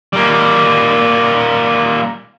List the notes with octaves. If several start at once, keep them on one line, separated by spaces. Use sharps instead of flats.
G3 A#3